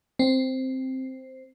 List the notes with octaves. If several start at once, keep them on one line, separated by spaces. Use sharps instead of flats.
C4